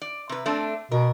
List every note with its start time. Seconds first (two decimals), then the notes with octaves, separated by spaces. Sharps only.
0.02 D5
0.29 C3 B4
0.46 A3 C4 D4
0.92 B2 A#4